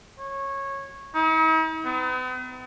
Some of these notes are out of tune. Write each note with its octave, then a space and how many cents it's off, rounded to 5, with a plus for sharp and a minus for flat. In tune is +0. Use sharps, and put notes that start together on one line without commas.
C#5 -15
D#4 +45
B3 +45